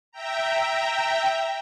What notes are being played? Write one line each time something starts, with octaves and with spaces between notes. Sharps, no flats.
E5 G5 A#5